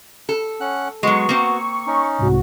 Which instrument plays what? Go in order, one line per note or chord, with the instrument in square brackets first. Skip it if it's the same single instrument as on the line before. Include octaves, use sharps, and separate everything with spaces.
[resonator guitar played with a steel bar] A4
[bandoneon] C#4 F#5 F#6
[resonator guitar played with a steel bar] F#3 G#3 [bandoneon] B3 F#4 [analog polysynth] C#6
[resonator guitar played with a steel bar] A#3 C4
[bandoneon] C#4 D#4
[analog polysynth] C2 G#2 F#4